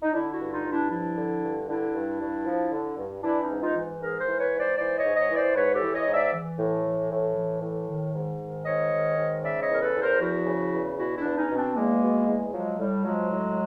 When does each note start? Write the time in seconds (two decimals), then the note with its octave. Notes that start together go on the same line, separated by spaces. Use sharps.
0.03 D#4
0.13 D3 D4 E4
0.33 E4 F#4
0.40 G2
0.52 D#4 F4
0.65 G2
0.71 D4 E4
0.90 F3 D4 E4
1.17 D3
1.42 G2
1.68 D3 D4 E4
1.94 G2
2.20 G2
2.45 F3
2.72 D3
2.97 G2
3.23 E3 D4 E4
3.43 C#4 D#4
3.49 G#2
3.61 D#4 F4
3.75 E3
4.00 G#2 G#4 A#4
4.20 A#4 C5
4.27 E3
4.39 B4 C#5
4.53 G#2
4.59 C5 D5
4.78 E3 C5 D5
4.97 C#5 D#5
5.04 G#2
5.16 C#5 D#5
5.30 E3
5.36 C5 D5
5.55 G#2 B4 C#5
5.75 G4 A4
5.81 E3
5.94 C#5 D#5
6.07 G#2
6.14 D5 E5
6.33 E3
6.59 A2
6.85 E3
7.11 A2
7.36 E3
7.62 A2
7.88 D#3
8.14 G#2
8.39 D#3
8.66 G#2 C#5 D#5
8.92 D#3
9.17 G#2
9.43 C#3 D5 E5
9.62 C#5 D#5
9.69 E2 A#4
9.81 A4 B4
9.95 E2
10.02 A#4 C5
10.21 F3 E4 F#4
10.46 C#3
10.72 E2
10.98 B2 E4 F#4
11.18 D4 E4
11.24 E2
11.37 C#4 D#4
11.50 B2
11.56 C4 D4
11.75 E2 G#3 A#3
12.02 B2
12.27 E2
12.53 F3 F#3 G#3
12.79 A2 G3
13.05 F3 F#3 G#3
13.30 A2